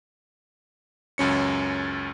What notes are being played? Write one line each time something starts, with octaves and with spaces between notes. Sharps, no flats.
C#2 F#2 C#4 C#7